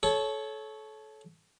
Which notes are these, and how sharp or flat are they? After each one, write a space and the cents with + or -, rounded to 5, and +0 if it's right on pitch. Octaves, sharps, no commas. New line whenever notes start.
A4 -25 C#5 +0